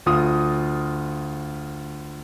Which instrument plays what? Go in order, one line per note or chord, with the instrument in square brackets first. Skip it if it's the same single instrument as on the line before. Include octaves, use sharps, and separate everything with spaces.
[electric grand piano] D2 F4 D#6